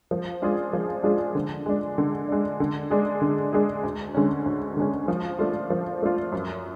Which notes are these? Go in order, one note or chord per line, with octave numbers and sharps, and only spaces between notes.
F3
G#3 D4 F4 G#4
F3
G#3 D4 F4 G#4
D3
G#3 D4
D3
G#3 D4
D3
G#3 D4 G#4
D3
G#3 D4 G#4
D2
D3 G#3 C#4
D2
D3 G#3 C#4
F3
A3 D4 F4
F3
A3 D4 F4
F#2